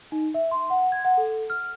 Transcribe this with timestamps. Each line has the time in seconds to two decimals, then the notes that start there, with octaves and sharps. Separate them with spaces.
0.12 D#4
0.34 E5
0.51 C6
0.70 F#5
0.92 G#6
1.05 F#5
1.17 A4
1.50 F6